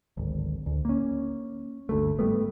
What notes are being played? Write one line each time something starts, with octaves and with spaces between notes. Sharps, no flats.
D1 G#1
D2
A#3 C#4
G1 D2 A3
G#2 G3 A3 B3